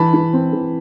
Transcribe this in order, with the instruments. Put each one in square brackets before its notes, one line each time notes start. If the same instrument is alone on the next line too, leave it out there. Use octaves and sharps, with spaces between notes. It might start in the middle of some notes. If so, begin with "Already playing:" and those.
Already playing: [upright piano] E3 A5 B5
E3
C4
E3